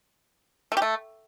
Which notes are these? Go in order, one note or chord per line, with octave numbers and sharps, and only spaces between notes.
A3
G4
A3